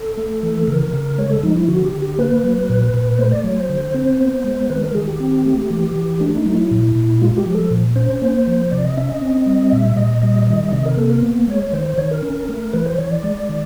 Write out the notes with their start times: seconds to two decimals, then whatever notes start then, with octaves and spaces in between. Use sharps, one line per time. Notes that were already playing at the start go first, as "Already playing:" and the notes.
Already playing: A4
0.17 A3
0.43 E3
0.68 C#3 A#4
0.93 C#3
1.18 G#3 C#5
1.31 A4
1.43 F3 D#4
1.55 E4
1.68 D3 F#4
1.85 G4
1.93 D3
2.02 G4
2.18 A#3 B4
2.44 F#3
2.70 A#2
2.94 A#2
3.19 A3 C5
3.32 D5
3.44 F#3 C#5
3.57 C5
3.69 D3
3.94 C4
4.19 B3
4.44 G#3
4.70 D#3 B4
4.83 A#4
4.95 D#3 G#4
5.07 G4
5.20 C4
5.45 A3
5.70 E3
5.96 E3
6.20 A3 D4
6.37 D#4
6.45 F#3
6.54 E4
6.71 A#2
6.96 A#2
7.22 G#3 F4
7.37 G4
7.46 F3
7.55 A4
7.71 A#2
7.96 C#4 C5
8.22 A#3 C5
8.47 F3
8.71 C3 D5
8.85 D#5
8.97 C#4 E5
9.09 D#5
9.21 C4
9.46 G3
9.71 A#2 E5
9.97 A#2 D#5
10.22 G3 D#5
10.47 D#3 D#5
10.72 C3 D#5
10.86 A#4
10.97 A#3 A4
11.10 A#4
11.23 B3
11.48 G#3 C#5
11.73 D#3 C5
11.86 C5
11.98 D#3 C#5
12.11 A#4
12.23 C#4
12.49 A3
12.73 E3 B4
12.86 C5
12.98 E3 C#5
13.12 D5
13.23 G#3
13.49 D#3